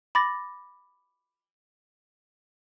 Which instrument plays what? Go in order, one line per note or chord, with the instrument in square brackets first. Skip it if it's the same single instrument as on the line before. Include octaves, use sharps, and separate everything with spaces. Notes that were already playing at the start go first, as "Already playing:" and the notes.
[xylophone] B5 D6 A6 A#6